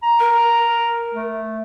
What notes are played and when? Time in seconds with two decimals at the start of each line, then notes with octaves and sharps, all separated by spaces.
0.03 A#5
0.19 A#4
1.14 A3